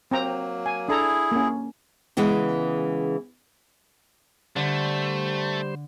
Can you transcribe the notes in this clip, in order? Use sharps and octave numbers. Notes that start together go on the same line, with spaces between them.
F#3 A#3 C4 G5 A#5
G#5
D4 E4 G#4 A4 A#5
A#3 C#4
C#3 E3 G#3 B3
D3 G3 A3 C5